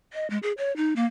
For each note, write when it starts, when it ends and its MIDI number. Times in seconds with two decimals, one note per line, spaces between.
0.13 0.28 75
0.30 0.38 56
0.43 0.52 68
0.58 0.74 73
0.76 0.94 63
0.96 1.05 58